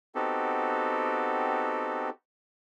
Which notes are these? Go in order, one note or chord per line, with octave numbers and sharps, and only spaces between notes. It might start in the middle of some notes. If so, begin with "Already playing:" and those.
B3 C4 D#4 F#4 G4 A4